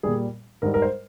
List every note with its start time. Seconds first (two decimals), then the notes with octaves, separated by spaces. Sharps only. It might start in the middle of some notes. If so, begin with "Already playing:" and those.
0.03 A#2 G3 G#4
0.62 G#2 G3 A#4
0.74 A#4
0.82 C5